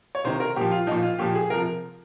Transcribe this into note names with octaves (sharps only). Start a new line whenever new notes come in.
C#5
C3 D#3 C5
A#4
A#2 F3 G4
F4
A#2 F3 D#4
F4
A#2 F3 G4
G#4
C3 F3 A#4